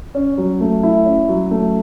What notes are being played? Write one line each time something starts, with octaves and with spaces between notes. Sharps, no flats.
C#4
F#3
A3
E4
C#4
F#3
A3